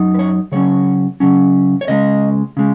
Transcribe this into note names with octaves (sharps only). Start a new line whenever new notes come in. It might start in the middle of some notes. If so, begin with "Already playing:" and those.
Already playing: F#2 F#3 D#4
B4
C#5
C#3 F#3 C#4 C#5
C#3 F#3 C#4
C#5
C#2 C#3 G#3 D#5
C#3 G#3